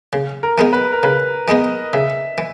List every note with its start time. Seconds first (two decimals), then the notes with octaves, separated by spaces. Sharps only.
0.13 C#3
0.43 A#4
0.58 E3 G#3 B3 D#4
0.73 B4
0.92 A#4
1.03 C#3 B4
1.48 E3 G#3 B3 D#4 D#5
1.93 C#3 E5
2.38 E3